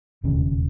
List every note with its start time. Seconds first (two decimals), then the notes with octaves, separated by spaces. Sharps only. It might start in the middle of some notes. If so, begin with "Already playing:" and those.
0.24 E1 D#2 C#3